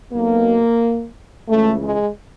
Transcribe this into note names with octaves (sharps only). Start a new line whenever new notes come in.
B1 B2 A#3
C#2 C#3 E3 A3
G#3